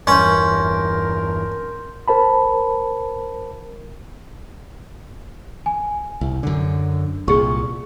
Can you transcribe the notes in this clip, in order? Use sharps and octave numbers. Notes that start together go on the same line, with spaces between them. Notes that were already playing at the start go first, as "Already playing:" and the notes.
E2 G2 C#4 A#4 C6 G6
A#4 C5 A5 B5
G#5
C2
F#2 D3
C2 A#2 G#4 C#6